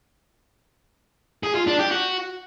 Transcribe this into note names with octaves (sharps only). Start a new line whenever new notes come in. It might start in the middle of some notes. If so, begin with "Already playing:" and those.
G#4
F4
D4
G4
F#4